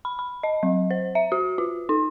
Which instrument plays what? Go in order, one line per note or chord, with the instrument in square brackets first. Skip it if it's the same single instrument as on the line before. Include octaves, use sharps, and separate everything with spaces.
[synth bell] B5
B5
D#5
F#3
C5
E5
F#4
F4
D#4